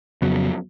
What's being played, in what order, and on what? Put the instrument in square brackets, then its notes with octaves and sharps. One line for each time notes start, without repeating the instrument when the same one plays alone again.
[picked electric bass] F2 C#3 F#3 B3